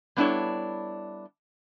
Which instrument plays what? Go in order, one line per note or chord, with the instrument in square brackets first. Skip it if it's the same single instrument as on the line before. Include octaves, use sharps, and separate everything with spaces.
[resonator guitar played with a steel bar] G3 B3 D4 E4 A4 C#5